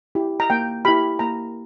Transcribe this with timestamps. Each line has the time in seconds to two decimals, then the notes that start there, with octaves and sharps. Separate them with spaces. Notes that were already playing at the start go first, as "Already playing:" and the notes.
0.15 E4 G4
0.40 A#5
0.50 A#3 G5
0.85 E4 G4 B5
1.19 A#3 A#5